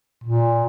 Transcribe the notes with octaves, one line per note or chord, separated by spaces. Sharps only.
A#2